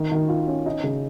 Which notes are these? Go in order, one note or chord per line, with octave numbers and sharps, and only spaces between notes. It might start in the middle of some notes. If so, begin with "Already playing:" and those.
Already playing: D#3
D#3
F4
C#4
D#4
C#3